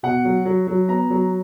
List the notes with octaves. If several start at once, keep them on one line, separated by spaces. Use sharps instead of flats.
B2 F#5
F#3
F#3
F#3
B3 A#5
F#3